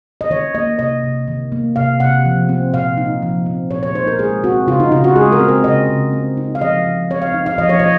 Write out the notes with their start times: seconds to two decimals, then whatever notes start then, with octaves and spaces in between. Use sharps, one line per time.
0.21 D#5
0.30 D#3 C#5
0.55 A#3 D#5
0.79 C3 D#5
1.04 C3
1.28 D#3
1.52 A#3
1.76 C3 F5
2.00 C3 F#5
2.25 F3
2.49 C4
2.73 A#2 F5
2.97 D#4
3.22 F3
3.46 C4
3.70 A#2 C#5
3.83 C#5
3.94 D#4 C5
4.07 A#4
4.19 G#3 G#4
4.44 C4 F#4
4.67 C#3 F4
4.80 D#4
4.91 C#3 F4
5.04 F#4
5.16 G#3 G#4
5.32 A#4
5.40 C4
5.48 A#4
5.64 C#3 D#5
5.89 C#3
6.13 C4
6.37 D#4
6.55 F5
6.61 F3 D#5
6.86 F3
7.10 C4 C#5
7.22 F5
7.34 D#4
7.46 F5
7.58 F3 D#5
7.69 C#5
7.79 F3 D#5